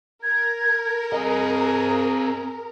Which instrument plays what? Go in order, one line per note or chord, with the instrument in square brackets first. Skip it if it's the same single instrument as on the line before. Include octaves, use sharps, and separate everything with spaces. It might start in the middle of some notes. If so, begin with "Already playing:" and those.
[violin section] A#4 [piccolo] G#6
[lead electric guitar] C4 D#5 [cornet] G#4 [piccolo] A#5